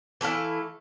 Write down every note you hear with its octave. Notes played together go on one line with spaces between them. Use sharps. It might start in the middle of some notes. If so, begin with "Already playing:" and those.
E3 A3 E4 F5